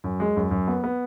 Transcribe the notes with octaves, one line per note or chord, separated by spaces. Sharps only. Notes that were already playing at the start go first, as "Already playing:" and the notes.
F#2
G#3
F#2
F#2
B3
B3